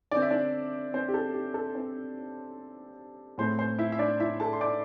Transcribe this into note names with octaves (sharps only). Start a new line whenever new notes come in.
D3 C4 D5
E5
D4 D5
C4 C5
G4
A4
G4
A4
C4 C5
A2 A3 C4 C5 C6
C5 C6
E4 E5
E5
D4 D5
E4 E5
A4 A5
C6
D5 D6